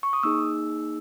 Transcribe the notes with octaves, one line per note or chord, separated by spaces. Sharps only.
C#6
D#6
A#3 D#4 G#4 E6